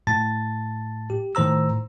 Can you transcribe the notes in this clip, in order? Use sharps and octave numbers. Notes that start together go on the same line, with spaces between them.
A2 A5 A6
G4
A2 D#3 C5 A#5 E6